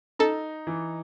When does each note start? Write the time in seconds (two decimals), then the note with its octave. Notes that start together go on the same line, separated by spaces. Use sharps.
0.19 D#4 A4
0.67 E3